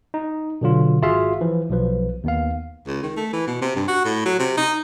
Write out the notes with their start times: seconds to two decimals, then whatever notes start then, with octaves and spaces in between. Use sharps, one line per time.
0.14 D#4
0.61 B2 D3 F#3 F4
1.02 G#1 F4 F#4 G#4 E5 F5
1.41 E3 F3
1.70 B1 F3 B4
2.24 D#2 B3 F5
2.87 C#2
3.03 D#3
3.17 A3
3.33 E3
3.47 B2
3.62 C3
3.76 G2
3.88 F#4
4.05 A2
4.25 F#3
4.39 C3
4.57 D#4